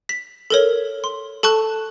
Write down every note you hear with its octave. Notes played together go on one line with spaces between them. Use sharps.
B6
A4 A#4 C#5
C6
A4 A5 C#6 F#6